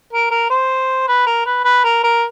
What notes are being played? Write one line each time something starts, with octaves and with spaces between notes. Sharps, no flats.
A#4
A#4
C5
B4
A#4
B4
B4
A#4
A#4